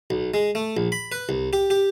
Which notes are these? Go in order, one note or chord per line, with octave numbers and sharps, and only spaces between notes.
B1
G#3
A3
A#1
B5
B4
C2
G4
G4